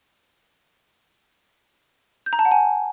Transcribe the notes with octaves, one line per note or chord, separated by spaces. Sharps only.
G6
A#5
A5
F#5
G#5